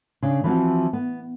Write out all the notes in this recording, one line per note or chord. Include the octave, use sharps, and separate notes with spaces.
C#3 D4
E3 F3 C4 F#4
B3